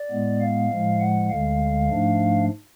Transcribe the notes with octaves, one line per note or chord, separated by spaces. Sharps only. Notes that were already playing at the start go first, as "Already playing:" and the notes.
Already playing: D5
A2 G#3 B3
F5
A2 F3 G#3
F#5
D2 D3 G#3 F5
G#2 F3 A3 D4